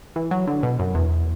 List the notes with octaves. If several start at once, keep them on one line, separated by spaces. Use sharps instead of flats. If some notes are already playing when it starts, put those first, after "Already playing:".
E3
F#3
D3
B2
F#2
E2